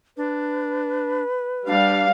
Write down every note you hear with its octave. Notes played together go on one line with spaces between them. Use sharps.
D4 B4
G3 D4 F5